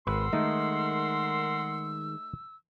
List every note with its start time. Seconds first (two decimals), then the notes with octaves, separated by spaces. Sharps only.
0.07 G#1 A#4 B4 F#5 C6 E6
0.33 D#3 G#3 A3 D#4